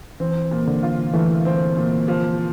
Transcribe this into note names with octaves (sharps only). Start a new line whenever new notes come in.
E3 C4
A#2
D3
F4
E3 A3
C4
A#2
F3